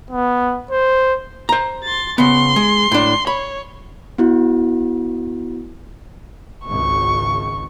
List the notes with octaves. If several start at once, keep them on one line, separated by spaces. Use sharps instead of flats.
B3
C5
C5 A#5
C6 A6
C#3 B3 C6
G#3
A2 D4
C#5 B5
B3 E4 F#4
G#1 C#2 C#6